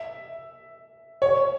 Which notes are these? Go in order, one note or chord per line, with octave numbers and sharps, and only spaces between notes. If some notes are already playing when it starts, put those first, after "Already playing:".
Already playing: E5
C#5